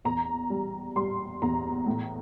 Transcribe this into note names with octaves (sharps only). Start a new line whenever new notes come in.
E2 A#5
G3
G3 C6
E2 A#5
A2